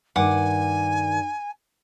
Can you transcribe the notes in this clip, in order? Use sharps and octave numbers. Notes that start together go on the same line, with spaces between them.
G2 D#3 F#5 G#5 D6